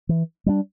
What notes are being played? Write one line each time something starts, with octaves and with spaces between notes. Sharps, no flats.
E3
G3 A#3 D4